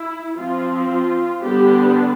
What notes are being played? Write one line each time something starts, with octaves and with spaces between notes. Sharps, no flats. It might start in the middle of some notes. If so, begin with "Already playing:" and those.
Already playing: E4
F3 C4 F4
F4
D3 G3 B3 D4 G4